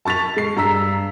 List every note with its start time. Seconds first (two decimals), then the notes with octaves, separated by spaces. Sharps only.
0.05 A5 C#6 A6 B6 F7
0.36 G#3 C7
0.57 G2 A#5 E6 B6